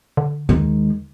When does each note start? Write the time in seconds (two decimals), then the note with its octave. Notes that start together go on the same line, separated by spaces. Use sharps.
0.17 D3
0.49 D#2 D#3 G#3